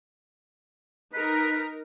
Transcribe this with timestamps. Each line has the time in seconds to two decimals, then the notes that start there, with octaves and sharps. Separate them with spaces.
1.13 D#4 A#4 B4